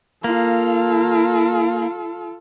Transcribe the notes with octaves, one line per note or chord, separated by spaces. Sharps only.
A#3 F4 A4